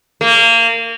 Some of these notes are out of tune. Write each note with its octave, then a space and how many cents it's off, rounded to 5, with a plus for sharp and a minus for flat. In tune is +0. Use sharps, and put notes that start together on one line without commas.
A#3 -25